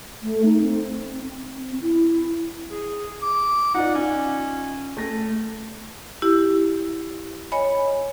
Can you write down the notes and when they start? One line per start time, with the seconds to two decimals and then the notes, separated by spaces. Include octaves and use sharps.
0.23 A3
0.45 D#4
0.61 C4
1.56 C4
1.82 E4
2.71 G#4
3.22 D6
3.74 D#4 F4 D5 F#5
3.95 C#4
4.97 A3 A#6
6.22 E4 G4
7.52 C#5 D#5 G#5 B5